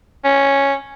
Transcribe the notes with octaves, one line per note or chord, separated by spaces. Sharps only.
C#4